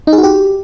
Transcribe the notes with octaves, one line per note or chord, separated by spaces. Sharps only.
D#4
G#4
F#4
G4